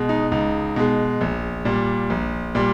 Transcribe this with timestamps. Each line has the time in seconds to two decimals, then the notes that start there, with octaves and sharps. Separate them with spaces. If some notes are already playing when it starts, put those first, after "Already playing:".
Already playing: B2 G#3
0.09 D#4
0.32 C#2 D#4
0.76 B2 G#3
1.21 A#1
1.65 A#2 G3
2.10 A#1
2.55 A#2 G3